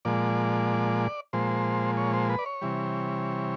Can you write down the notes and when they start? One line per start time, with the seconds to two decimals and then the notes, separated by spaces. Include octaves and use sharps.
0.05 A#2 F3 G#3 D5
1.33 A#2 F3 G#3 C5
1.97 C#5
2.13 C5
2.30 B4
2.39 D5
2.46 C#5
2.61 C3 E3 G3